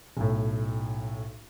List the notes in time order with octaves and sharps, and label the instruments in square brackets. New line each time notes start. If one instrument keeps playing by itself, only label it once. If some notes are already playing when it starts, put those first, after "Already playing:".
[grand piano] B1 A2